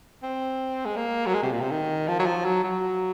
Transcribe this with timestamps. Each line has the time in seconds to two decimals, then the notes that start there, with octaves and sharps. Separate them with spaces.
0.23 C4
0.85 G#3
0.96 A#3
1.26 F#3
1.34 G#3
1.43 C3
1.52 A#2
1.61 C3
1.71 D#3
2.08 F3
2.19 F#3
2.26 F3
2.45 F#3
2.64 F#3